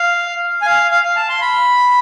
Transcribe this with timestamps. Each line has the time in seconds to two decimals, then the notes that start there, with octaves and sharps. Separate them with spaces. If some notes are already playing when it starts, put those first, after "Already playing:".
Already playing: F5
0.62 G#5
0.66 F5
0.91 F5
1.04 F5
1.16 A5
1.29 C6
1.41 B5